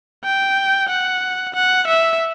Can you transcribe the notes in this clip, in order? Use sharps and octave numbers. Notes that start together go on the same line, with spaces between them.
G5
F#5
F#5
E5